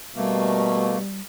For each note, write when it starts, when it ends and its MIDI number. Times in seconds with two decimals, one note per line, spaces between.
0.16 0.98 47
0.16 1.20 55
0.16 0.98 57
0.16 0.98 58